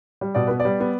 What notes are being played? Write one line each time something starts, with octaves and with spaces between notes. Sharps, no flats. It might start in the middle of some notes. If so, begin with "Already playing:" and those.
G3
B2 D5
B3 B4
D5
G3
B3